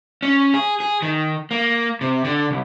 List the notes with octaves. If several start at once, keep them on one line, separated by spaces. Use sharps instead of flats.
C#4
G#4
G#4
D#3
A#3
C3
D3
C2